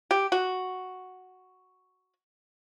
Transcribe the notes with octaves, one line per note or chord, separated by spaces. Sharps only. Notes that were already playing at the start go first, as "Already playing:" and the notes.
G4
F#4